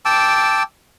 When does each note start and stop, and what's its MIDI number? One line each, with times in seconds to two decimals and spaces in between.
0.05 0.63 79
0.05 0.63 81
0.05 0.63 86
0.05 0.63 88